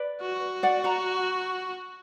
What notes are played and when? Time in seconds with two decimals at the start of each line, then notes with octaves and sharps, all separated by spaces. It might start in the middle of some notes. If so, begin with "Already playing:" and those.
Already playing: B4 D5
0.21 F#4
0.63 D5 F#5
0.84 F#5 A#5